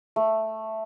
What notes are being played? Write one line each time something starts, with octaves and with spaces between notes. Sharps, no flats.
A3